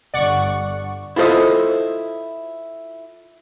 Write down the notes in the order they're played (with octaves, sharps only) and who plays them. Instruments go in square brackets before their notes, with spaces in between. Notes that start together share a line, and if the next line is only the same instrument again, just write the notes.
[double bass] G1 D3 [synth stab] D5 F#5 C#6
[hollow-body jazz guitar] E4 F4 A4 C5 D#5